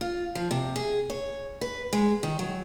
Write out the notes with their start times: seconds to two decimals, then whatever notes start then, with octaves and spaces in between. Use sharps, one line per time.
0.01 F4
0.35 F3
0.51 C3
0.76 G#4
1.10 C#5
1.61 B4
1.93 G#3
2.23 D#3
2.39 F#3